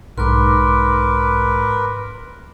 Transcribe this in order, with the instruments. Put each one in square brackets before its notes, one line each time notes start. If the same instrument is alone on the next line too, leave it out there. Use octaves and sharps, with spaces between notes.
[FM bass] B1 [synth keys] G#2 [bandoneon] A#4 B4 [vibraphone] C6 D6